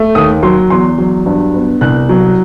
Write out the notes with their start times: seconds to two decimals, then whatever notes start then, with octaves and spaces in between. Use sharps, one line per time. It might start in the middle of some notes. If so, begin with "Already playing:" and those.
Already playing: A3
0.15 D#2 D#6
0.43 F#3 C6
0.70 E2 C6
0.98 F#3
1.26 G2
1.54 B3
1.81 C2 F#6
2.09 F#3